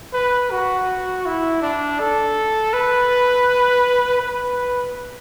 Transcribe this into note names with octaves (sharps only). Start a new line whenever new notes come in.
B4
F#4
E4
D4
A4
B4
B4